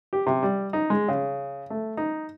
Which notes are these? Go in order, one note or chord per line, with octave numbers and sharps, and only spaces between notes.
G4
C3
G3
D#4
G#3
C#3
A3
D#4